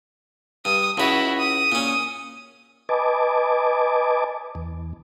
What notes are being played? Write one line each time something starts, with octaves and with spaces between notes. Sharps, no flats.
G2 D#6
C#2 E4 F#4 C#5
D#6
A#2 C#4
B4 D#5 G#5 A5 D6
E2